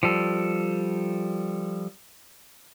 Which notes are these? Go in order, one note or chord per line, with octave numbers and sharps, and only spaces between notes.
F3 G3 A4